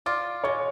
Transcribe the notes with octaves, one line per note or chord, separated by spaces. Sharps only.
F4 D5 D6
G#3 C#5 C#6